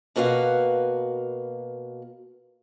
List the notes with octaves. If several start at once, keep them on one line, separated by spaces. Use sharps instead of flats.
B2 A#3 F#4 B4 F5